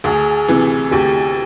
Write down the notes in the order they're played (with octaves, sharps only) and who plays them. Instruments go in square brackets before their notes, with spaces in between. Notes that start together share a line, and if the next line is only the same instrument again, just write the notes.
[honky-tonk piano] D2 [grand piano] G#4
[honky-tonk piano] C3 E3
[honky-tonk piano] D2 [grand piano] G4